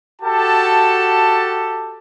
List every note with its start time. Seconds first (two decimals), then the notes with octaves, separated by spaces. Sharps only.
0.22 F#4 G4 A4 A5